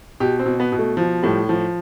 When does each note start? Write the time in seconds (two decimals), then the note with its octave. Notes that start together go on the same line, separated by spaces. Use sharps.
0.20 B2 G4
0.39 C4
0.46 B2
0.60 B3
0.72 B2
0.79 A3
0.97 F3
1.23 A2 G3
1.49 F3